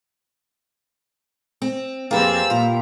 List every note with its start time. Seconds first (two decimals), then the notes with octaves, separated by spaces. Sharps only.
1.62 C4
2.11 F2 A#3 C4 G4 G#4 B4 E6 A6
2.50 A#2 F4 A#5